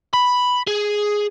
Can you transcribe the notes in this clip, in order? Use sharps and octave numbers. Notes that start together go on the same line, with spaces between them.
B5
G#4